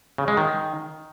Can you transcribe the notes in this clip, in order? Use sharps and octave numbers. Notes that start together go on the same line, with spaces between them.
C#3
G#3
D#3